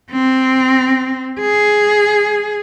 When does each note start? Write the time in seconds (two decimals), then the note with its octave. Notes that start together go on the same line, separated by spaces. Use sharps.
0.12 C4
1.41 G#4